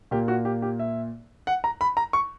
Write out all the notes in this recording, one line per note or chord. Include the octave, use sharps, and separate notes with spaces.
A#2 A#3 G4
F#4
G4
G4
E5
F#5
A#5
B5
A#5
C#6